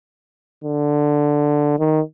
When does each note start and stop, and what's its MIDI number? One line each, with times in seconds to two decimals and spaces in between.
0.64 1.79 50
1.79 2.00 51